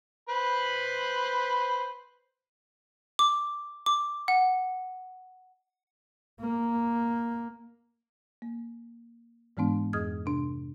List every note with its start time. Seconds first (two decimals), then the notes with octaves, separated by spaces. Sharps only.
0.29 B4 C5 B5
3.19 D6
3.86 D6
4.28 F#5
6.41 A#3
8.42 A#3
9.57 G#2 E3 G#3 B3 D4
9.93 F2 G#4 D#5 D#6 F6 G#6
10.26 C3 D4